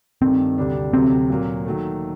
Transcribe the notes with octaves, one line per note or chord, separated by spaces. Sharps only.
G2 D#3 A3 C4
D2 C3 G3 D4
D2 C3 F#3 C4
A#2 F#3 A#3
D#3 F#3 A3